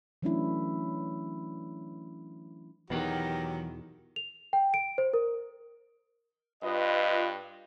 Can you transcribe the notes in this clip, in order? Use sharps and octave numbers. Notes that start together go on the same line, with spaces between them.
E3 F#3 A3 C#4 D4 E4
E2 B2 D#3 E3 F#3 G4 F#5
F7
G5
D7
C5
A#4
G2 F4 B4 D#5